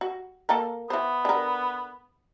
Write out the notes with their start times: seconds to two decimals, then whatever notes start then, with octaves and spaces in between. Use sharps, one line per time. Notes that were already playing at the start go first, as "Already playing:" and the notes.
0.01 F#4
0.49 A#3 A4 A#4
0.90 E3 B3 C5
1.25 D3 A#4